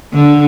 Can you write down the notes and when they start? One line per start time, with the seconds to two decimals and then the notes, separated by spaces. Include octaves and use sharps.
0.13 D3